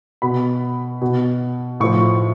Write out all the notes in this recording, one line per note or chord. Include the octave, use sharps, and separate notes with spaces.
B2 B5
B2
A2 F3 C#6